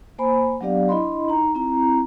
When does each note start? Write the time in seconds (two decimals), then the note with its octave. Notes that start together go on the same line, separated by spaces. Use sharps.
0.19 A#3 C5 G#5 B5
0.61 F#3 B3 D4 G4 D5 F5
0.89 D4 E4 D#5 B5 C6
1.28 D#4 A#5
1.55 C4 E4 A#5